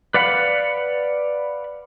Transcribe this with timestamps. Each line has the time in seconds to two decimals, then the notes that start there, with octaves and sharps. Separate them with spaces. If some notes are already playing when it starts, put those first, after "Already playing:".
0.14 B4 D5 F5 F#5 B5